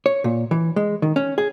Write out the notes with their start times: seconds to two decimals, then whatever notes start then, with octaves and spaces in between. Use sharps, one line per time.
0.06 C#5
0.24 A#2
0.51 E3
0.76 G#3
1.02 D#3
1.16 C#4
1.38 G#4